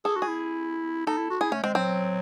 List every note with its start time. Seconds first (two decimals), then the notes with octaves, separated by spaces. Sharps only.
0.05 G#4 A4
0.17 F#4
0.22 G#4
0.28 E4
1.07 D#4 A4
1.18 E4
1.30 F#4
1.41 E4 G#4
1.52 A3 C#4
1.63 G#3 C4
1.75 F#3 C4